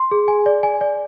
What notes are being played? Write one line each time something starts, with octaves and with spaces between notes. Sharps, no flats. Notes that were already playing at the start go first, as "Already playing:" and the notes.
Already playing: C6
G#4
G#5
D5
G#5
D5